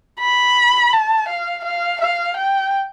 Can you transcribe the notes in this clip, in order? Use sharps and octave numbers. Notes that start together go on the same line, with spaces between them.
B5
A5
F5
F5
F5
G5